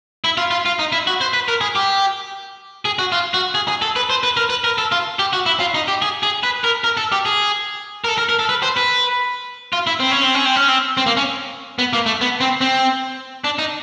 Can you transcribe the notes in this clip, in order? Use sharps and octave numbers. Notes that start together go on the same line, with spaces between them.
E4
F4
F4
F4
D#4
E4
F#4
C5
B4
A#4
G#4
G4
G#4
F#4
F4
F#4
G#4
G#4
A4
B4
C5
B4
A#4
B4
A#4
A4
F4
G4
F#4
E4
F4
D#4
G4
G#4
G#4
B4
A#4
A#4
A4
G4
G#4
A#4
A4
A#4
A#4
A4
B4
C5
B4
F4
E4
C4
C#4
C4
C#4
C4
C#4
C4
C4
A#3
C#4
B3
A#3
A3
B3
C4
C4
D4
D#4